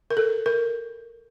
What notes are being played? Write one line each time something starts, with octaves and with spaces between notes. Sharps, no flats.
A#4
A4
A#4